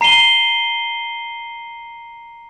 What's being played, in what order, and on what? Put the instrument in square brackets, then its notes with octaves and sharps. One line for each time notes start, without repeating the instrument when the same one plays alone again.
[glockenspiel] A#5 C7 D#7 G7